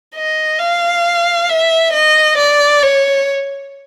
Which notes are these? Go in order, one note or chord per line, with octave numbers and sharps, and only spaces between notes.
D#5
F5
E5
D#5
D5
C#5